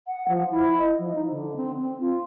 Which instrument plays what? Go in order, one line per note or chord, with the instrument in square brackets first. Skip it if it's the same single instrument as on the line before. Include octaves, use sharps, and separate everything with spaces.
[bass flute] F#5
F3
E4
D#5
F3
D#4
D3
C4
C4
F4